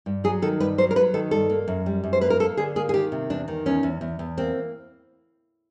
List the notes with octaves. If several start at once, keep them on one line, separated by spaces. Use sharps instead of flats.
G2
F#3 G#4
D#3 A4
G2 B4
F#3 C5
A#4
F#3 B4
D#3 A4
G2 A4
A#3
F#2
G3
F#2
C5
A#3 B4
A#4
A#3 A4
D3 G#4
A#3 G#4
G#4
D#3 G4
C3
E2 D4
D#3
E2 C#4
E2
E2
E2
A#3 C4